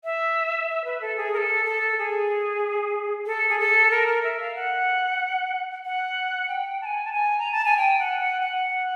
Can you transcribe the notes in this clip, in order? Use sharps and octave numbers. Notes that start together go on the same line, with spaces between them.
E5
E5
B4
A4
G#4
A#4
A4
A4
G#4
A4
G#4
A4
A#4
A#4
E5
F5
F#5
F#5
G5
A5
G#5
A5
G#5
A#5
A5
G#5
G5
F#5
F#5
F#5